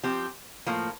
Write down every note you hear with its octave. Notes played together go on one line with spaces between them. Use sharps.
F3 C4 G4
A2 F3 A#3